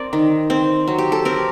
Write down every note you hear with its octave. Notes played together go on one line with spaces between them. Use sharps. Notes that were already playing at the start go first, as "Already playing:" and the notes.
Already playing: C4 A#4 D5
D#3
C4
F#3
G4
A4
C4 A#4